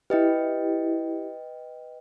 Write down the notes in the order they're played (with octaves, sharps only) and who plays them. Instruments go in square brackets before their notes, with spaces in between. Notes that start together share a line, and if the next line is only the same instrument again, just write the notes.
[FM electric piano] E4 G4 [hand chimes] B4 D#5 G5